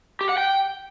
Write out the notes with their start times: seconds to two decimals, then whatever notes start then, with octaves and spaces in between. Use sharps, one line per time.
0.21 G4
0.29 F#5
0.38 G5